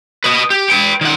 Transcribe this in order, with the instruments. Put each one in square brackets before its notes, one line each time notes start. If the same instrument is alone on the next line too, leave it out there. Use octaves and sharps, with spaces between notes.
[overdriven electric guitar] B4 D#5
G4
B4 G5
D#3 F#5